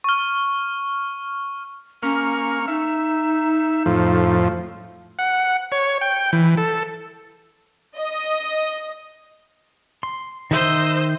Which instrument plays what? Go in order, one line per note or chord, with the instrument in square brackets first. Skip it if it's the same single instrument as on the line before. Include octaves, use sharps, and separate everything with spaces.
[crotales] C#6 F6
[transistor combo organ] A#3 C#6 F6 [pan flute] C#4
[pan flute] D#4 [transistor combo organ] E5
[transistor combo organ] F2 A2 F3
F#5
C#5
G5
E3
A4
[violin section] D#5
[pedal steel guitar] C6
[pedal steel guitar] D#3 E5 G6 [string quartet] C5 D#5 E6